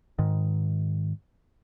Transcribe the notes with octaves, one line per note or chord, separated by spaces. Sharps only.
G#2 D#3